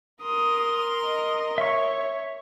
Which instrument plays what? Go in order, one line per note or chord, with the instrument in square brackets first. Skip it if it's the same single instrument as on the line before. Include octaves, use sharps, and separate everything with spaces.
[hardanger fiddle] A#4 C6 [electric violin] D#6
[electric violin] D#5
[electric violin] C#5 [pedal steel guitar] E5 C#6